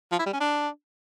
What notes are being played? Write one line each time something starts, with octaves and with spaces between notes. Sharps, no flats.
F3
E4
G3
C#4
D4